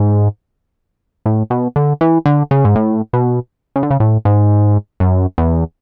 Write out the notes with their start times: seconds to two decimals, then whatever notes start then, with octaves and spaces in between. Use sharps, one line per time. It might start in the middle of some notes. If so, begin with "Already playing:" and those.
Already playing: G#2
1.26 A2
1.50 B2
1.76 D3
2.01 E3
2.26 D3
2.51 C#3
2.65 G#2
2.75 A2
3.13 B2
3.76 C#3
3.83 D3
3.91 C#3
4.00 A2
4.25 G#2
5.00 F#2
5.38 E2